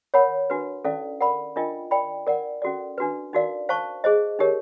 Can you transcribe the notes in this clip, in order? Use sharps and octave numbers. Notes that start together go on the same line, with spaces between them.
A#4 C#5 F#5 B5
D4 F#4 B4
C#4 E4 A4 D5 F5
A#4 D5 F#5 B5
D4 F4 A#4 D#5 G5
A#4 D5 G5 B5
A#4 D5 F#5
C#4 F#4 A4 D5
D4 F#4 B4
D#4 F#4 A#4 D5 F5
C5 F5 A5 C#6
G#4 C5 D#5
D#4 G4 A#4 C#5